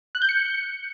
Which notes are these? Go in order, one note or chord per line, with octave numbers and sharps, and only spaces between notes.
F#6
G6
C#7